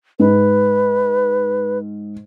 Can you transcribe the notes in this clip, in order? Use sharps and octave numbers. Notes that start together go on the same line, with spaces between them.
G#2 B4